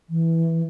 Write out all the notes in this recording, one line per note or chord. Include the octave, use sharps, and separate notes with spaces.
E3